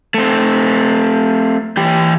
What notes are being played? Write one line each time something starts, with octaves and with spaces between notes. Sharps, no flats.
A3 C4
E3 G4 G5